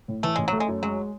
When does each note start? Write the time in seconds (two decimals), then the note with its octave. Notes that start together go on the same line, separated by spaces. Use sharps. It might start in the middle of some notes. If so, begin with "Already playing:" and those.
0.08 A2
0.23 E3 A3
0.36 A1 G#3
0.48 F#3 A3
0.60 G#3
0.68 F#2
0.83 F#3 G#3